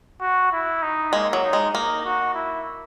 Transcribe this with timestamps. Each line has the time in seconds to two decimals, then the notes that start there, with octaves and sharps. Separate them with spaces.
0.21 F#4
0.52 E4
0.83 D#4
1.13 G#3 A#3
1.33 F#3
1.44 D#4
1.53 G#3
1.73 A#3 D#4
2.05 F#4
2.34 E4